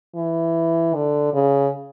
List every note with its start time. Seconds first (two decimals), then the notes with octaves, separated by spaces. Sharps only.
0.16 E3
0.95 D3
1.34 C#3